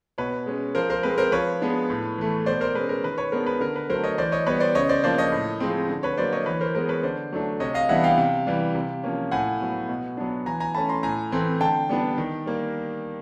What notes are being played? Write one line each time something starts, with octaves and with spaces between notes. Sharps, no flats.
B2 B4 C#5
G#3 C#4
F3 A#4 C5
A#4 C5
G#3 C4 B4
A#4 C5
F3 B4 C#5
G#3 B3 D4
A2
E3 A3
B2 C5 D5
A#4 C5
G#3 C#4 B4
A#4
D#3 B4
B4 C#5
G#3 B3 D4 A#4 C5
B4
D3 A#4
B4
F#3 A3 A#4 C5
C#5 D#5
E3 C5 D5
C#5 D#5
G3 B3 B4 C#5
C5 D5
C#3 C#5 D#5
C5 D5
F3 A#3 D4 C5 D5
C#5 D#5
A2
F3 G#3 C4
D3
B4 C#5
F#3 A#3 C5 D5
C#5 D#5
E3 B4 C#5
A#4 C5
G#3 B3 A#4 C5
B4 C#5
D3 C5 D5
F#3 A3 D4
C3 C#5 D#5
D#5 F5
E3 G3 B3 D4 E5 F#5
F5 G5
C3
E3 G3
C3
F3 A#3 C#4
A2 F#5 G#5
F#3 B3
B2
F#3 B3 D4
E3 G#5 A#5
G#5 A#5
A3 C#4 A5 B5
A#5 C6
A2 G#5 A#5
E3 A3 C4
D3 G5 A5
G3 B3 D4
D#3
G3 A#3